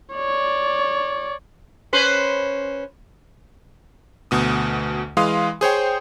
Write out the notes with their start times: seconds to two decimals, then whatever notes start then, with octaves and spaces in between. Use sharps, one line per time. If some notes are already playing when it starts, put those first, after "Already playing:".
0.14 C#5 D5
1.93 C#4 B4 C5
4.31 D2 B2 D#6
5.17 E3 G#3 F5 C6 D#6
5.61 G#4 C5 C#5 G5